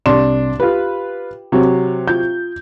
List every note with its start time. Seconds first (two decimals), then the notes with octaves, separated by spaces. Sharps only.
0.06 C2 D4 C6 E7
0.60 F4 G4 B4
1.52 C3 F#3
2.08 F4 G6